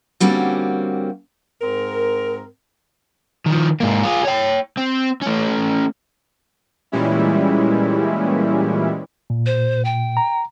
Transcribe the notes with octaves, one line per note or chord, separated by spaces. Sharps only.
D3 G3 A#3 C4 C#4 F#4
G#2 C4 A#4
D#3 F3
G#2 A#3
F4 G#4
C#5 G5
C4
A3 C#4
A#2 E3 G3 G#3 C#4 E4
A#2
C5
G5
A#5